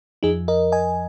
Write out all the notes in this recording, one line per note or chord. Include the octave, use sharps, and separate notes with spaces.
F2 F3 D#4 G#4
A#4 D#5
D#5 G#5